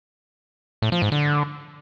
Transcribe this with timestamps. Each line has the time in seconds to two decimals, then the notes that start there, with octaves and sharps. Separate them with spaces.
0.82 A2
0.92 F3
1.02 G#2
1.12 D3